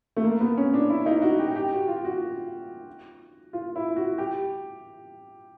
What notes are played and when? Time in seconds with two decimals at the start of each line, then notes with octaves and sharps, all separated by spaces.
0.16 A3
0.24 A#3
0.40 B3
0.57 C#4
0.74 D4
0.90 E4
1.06 D#4
1.22 F#4
1.39 G4
1.56 G4
1.72 F#4
1.88 F4
2.05 F#4
3.53 F4
3.76 E4
3.96 F#4
4.18 G4